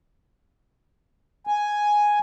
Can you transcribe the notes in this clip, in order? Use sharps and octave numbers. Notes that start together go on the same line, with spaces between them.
G#5